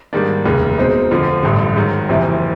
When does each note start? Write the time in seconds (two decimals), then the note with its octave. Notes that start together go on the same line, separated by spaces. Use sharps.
0.13 G#2 D#3 G3 A#3 D4
0.45 F1 D#2 C#3
0.78 B2 G#3 C4 D#4
1.11 F2 D3 F3
1.43 A1 G2 D3
1.76 G#2 D#3 F#3
2.09 F#1 F2 C3 E3